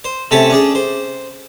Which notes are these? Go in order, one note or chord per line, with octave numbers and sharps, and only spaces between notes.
C5
C3 A3 C#4 A4 C#5 A5
C#4 D4 G#4
C5